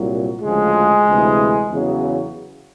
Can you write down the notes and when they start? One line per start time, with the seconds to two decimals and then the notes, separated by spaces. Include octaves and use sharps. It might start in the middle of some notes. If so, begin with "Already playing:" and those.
Already playing: C2 A#2 F#3
0.42 D2 C#3 F3 G#3 G#4
1.07 D2 C3 E3
1.71 E2 C#3 F#3